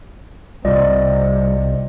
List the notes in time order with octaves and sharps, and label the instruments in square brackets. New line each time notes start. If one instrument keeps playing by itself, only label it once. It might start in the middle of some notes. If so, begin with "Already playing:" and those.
[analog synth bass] C2 [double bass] C3 [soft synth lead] G3 [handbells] F4 D5 D#5